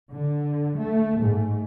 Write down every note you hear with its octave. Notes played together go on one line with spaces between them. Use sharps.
D3
A3
G#2